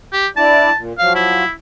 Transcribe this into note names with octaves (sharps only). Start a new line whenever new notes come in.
G4
D4 E4 D5 A5
A#2
F3 F#3 F5
E4